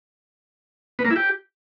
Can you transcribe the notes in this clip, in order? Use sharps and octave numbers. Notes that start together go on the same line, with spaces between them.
B3
A#3
E4
G4